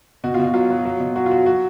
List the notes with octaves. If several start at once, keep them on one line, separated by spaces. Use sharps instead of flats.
B2 F#4
B2 F4
F#4
F#3 F4
F#3
F#3
B2
F#3 F#4
F4
F#3 F#4
F#3 F#4